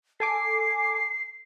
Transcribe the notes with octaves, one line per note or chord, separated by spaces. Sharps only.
A4 G#5 D6 C7